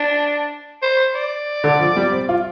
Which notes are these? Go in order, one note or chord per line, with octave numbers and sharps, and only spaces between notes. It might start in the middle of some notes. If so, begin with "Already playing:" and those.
Already playing: D4
C5
D5
D3
F3
G3
C4
F4